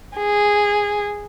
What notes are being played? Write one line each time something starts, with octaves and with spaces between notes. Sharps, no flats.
G#4